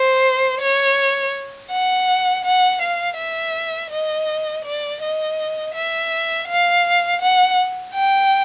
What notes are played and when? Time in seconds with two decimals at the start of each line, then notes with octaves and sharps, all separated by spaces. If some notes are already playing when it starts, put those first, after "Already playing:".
Already playing: C5
0.61 C#5
1.72 F#5
2.45 F#5
2.82 F5
3.18 E5
3.91 D#5
4.65 D5
5.02 D#5
5.75 E5
6.48 F5
7.21 F#5
7.95 G5